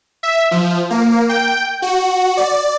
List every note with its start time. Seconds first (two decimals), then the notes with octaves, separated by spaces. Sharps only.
0.23 E5
0.51 F3
0.90 A#3
1.29 G5
1.82 F#4
2.37 D5